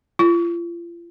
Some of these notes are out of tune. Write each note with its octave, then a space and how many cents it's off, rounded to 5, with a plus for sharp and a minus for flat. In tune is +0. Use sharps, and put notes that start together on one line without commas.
F4 -40